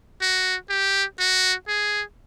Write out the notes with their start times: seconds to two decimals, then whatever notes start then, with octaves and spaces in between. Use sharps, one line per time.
0.22 F#4
0.70 G4
1.19 F#4
1.68 G#4